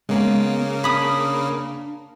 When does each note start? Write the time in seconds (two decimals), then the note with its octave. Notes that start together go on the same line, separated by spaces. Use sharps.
0.09 C#3 G#3 A#3 B3 G#5
0.84 D4 B5 D#6